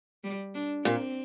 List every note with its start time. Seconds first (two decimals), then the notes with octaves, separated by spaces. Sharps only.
0.24 G3
0.54 D4
0.85 A#2 C4